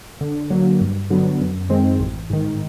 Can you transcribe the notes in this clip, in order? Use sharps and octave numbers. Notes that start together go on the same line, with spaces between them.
D3
F#3 A#3
G2
D3 F#3 B3
F#2
D#3 G#3 C4
A1
G#2 D#3